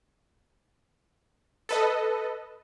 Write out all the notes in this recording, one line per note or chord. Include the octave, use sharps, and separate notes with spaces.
A4 B4 D#5